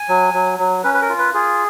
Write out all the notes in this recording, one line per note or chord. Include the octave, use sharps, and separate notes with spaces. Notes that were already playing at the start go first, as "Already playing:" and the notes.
Already playing: G#5
F#3
F#3
F#3
C#4 B4
B4
A#4
F4
B4
F4 G#4